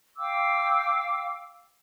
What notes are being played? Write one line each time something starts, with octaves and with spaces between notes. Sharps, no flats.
F5 G5 D6 E6